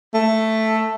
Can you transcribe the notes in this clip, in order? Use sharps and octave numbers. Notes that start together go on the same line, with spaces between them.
A3